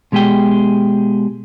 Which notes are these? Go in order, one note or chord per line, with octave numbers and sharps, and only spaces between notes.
B2 G#3 G4 G#4 G5